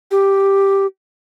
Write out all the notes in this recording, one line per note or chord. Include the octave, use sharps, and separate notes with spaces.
G4